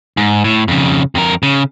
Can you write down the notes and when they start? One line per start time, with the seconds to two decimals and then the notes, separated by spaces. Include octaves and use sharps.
0.17 G#2
0.44 A2
0.68 F2 C#3
1.15 F2 A#4
1.43 C#3